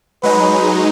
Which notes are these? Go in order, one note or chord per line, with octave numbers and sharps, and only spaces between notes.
F#3 G#3 D#4 B4